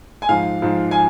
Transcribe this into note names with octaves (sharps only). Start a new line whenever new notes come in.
G#5
G#2 F3 F5
G#2 F3
G#5